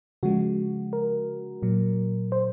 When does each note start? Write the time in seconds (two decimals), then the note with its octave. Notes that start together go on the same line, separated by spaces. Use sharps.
0.23 C#3 F3 G#3 F#4
0.93 A#4
1.62 A#2 F#3
2.32 C5